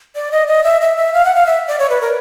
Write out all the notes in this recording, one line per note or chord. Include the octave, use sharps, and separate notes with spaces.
D5
D#5
D#5
E5
E5
E5
F5
F#5
F5
E5
D5
C#5
B4
A#4